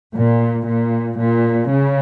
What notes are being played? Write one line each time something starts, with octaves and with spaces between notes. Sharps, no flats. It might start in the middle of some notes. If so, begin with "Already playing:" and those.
A#2
A#2
A#2
C#3